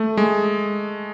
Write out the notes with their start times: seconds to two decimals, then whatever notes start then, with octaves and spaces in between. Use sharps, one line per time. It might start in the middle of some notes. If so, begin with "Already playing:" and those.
Already playing: A3
0.17 G#3